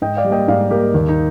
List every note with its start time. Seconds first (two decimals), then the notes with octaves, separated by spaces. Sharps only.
0.02 G#2 D#5 G5
0.17 D5 F5
0.24 G3
0.30 A#3 D#5 G5
0.48 G#2 D5 F5
0.71 G3 A#3 G4 A#4
0.94 D#2
1.09 D#4